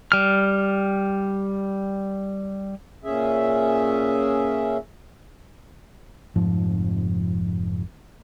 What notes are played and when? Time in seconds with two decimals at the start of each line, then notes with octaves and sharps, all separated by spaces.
0.12 G3 F6
3.04 A#2 C#4 G#4 E5
6.36 F1 G#2 F3